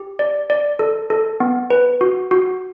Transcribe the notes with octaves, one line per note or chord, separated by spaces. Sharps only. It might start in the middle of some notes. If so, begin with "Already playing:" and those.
Already playing: G4
D5
D5
A4
A4
B3
B4
F#4
F#4